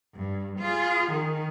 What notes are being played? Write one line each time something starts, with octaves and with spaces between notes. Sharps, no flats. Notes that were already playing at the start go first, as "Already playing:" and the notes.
G2
F4 G#4
D#3